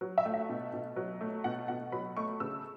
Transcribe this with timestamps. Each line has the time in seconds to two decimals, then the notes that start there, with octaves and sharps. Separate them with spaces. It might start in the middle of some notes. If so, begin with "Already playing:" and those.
0.01 F#3
0.18 E5
0.25 A3
0.34 E5
0.49 B2
0.74 B2
0.96 F#3
1.21 A3
1.44 B2 F#5
1.68 B2 F#5
1.92 F#3 B5
2.17 A3 C#6
2.40 C#3 E6